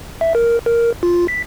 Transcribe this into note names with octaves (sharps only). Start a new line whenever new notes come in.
E5
A#4
A#4
F4
B6